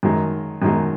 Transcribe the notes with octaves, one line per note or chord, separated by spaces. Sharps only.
F#2 D#3 G#3
F#2 D#3 G#3